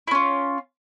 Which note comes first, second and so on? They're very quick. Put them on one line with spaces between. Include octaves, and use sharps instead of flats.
E4 C#4 F4